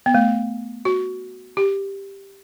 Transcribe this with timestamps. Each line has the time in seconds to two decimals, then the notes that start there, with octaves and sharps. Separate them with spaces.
0.06 B3
0.15 A3
0.85 F#4
1.57 G4